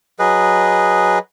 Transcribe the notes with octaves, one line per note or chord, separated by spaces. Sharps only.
F#3 G#4 B4 D#5